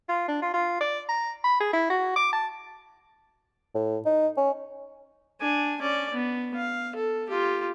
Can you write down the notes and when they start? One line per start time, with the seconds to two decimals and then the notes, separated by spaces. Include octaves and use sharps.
0.09 F4
0.28 D4
0.42 F4
0.54 F4
0.81 D5
1.09 A#5
1.44 B5
1.60 G#4
1.73 E4
1.90 F#4
2.16 D6
2.33 A5
3.75 A2
4.05 D#4
4.37 C#4
5.40 D4 G#5
5.81 C#4 D5
6.14 B3
6.56 F5
6.96 A4
7.29 F4 G4